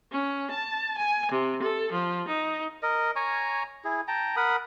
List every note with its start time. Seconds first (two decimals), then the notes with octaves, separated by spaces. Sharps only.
0.11 C#4
0.50 A5
0.98 G#5
1.31 C3
1.62 A4
1.91 F3
2.28 D#4
2.83 A#4 D#5
3.16 C#5 G#5 A#5 C#6
3.85 E4 G#4
4.08 G5 A5 A#5
4.36 A#4 F#5 B5 D#6